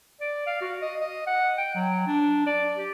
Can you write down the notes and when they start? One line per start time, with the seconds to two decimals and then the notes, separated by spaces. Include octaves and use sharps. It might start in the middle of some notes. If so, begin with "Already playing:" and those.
0.21 D5
0.47 F5
0.62 F#4
0.82 D#5
1.01 D#5
1.27 F#5
1.58 G5
1.75 F#3
2.07 D4
2.46 D5
2.76 G4